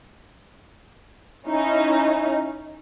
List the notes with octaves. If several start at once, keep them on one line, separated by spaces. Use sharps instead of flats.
C#4 D#4 E4